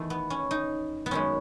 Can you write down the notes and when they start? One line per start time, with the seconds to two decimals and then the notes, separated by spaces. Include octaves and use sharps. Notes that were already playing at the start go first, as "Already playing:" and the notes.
Already playing: E2 D#3 A3
0.10 B3
0.30 C#4
0.51 D#4
1.06 B3
1.11 F#2 D#3 G#3 C#4